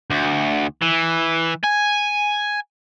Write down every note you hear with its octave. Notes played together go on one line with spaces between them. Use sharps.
D2
E3
G#5